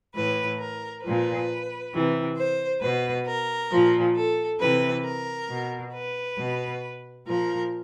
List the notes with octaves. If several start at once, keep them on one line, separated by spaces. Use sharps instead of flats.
A2 E3 B4
A#4
A#2 F3 B4
C3 E3
C5
B2 B4
A#4
A#2 F3
A4
C3 E3 B4
A#4
B2
B4
B2
A#2 F3 A#4